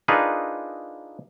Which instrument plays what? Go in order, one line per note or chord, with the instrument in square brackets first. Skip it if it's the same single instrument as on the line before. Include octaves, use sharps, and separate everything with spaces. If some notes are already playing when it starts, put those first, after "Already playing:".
[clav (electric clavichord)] D4 D#4 F4 G#4 A#4 B4